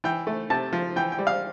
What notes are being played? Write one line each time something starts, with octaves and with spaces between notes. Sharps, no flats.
E3 G5
A3
C3 A5
F3
E3 G5
G5
G3
F5